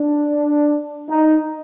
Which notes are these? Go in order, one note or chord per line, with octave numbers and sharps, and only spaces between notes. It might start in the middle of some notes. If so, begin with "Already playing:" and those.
Already playing: D4
D#4